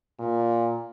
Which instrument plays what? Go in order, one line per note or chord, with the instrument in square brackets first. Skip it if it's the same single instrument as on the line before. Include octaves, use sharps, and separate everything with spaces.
[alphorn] A#2